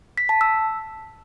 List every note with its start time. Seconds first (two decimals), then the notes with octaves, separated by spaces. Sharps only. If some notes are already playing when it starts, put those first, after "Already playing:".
0.18 B6
0.29 A5
0.41 E6